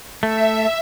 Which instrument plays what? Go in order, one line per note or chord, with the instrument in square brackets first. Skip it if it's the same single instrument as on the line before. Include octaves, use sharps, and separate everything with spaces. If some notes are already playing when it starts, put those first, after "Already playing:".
[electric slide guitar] A3 [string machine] E5